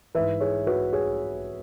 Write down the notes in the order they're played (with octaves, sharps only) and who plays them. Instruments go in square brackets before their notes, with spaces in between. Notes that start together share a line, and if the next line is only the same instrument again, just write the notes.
[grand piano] G#2 E3 B4 E5
G#4 C#5
F#4 B4
G#4 C#5